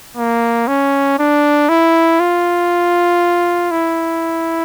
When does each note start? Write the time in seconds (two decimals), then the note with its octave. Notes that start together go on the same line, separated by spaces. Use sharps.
0.17 A#3
0.68 C#4
1.19 D4
1.69 E4
2.20 F4
3.71 E4